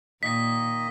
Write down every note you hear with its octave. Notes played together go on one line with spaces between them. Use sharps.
A#2 D#3 A#3 D#5 B6